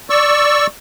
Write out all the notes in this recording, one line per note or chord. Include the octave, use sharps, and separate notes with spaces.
D5 C#6 E6